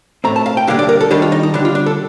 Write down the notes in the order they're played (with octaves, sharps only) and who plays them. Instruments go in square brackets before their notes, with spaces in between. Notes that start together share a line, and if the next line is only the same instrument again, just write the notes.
[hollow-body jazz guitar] A2 A3 C4 A#5
A5
F5
G5
D3 G3 A#3 D4 F5
D5
A#4
A4
D#3 G3 D4 G4
F4
D#4
D#4
D3 G3 D4 G4
F4
D4
A4